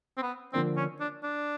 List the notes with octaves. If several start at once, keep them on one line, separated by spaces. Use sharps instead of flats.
C4
B3
D3 F3 A#3 C4 D4
C#4
D4
D4